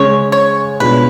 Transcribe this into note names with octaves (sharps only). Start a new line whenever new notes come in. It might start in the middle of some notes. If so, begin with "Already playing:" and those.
Already playing: C#3 G#3 C#4 C#5
C#5
B2 G#3 D4 F4 B4